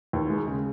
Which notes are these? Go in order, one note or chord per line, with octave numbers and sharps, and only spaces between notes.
D#2
G#3
C#3